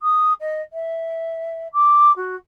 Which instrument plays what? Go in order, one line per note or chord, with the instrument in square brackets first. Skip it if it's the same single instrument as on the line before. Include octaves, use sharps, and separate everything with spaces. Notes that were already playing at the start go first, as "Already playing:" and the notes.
[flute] D#6
D#5
E5
D6
F#4